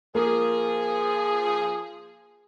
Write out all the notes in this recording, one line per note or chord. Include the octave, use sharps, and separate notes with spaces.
F3 A#3 G#4